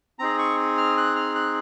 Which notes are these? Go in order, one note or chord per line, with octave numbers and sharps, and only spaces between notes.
C4 D#4 G#4 A#5
C#6
F6
F#6
F6
F#6